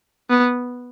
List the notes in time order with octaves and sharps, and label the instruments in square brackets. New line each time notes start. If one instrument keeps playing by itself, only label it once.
[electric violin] B3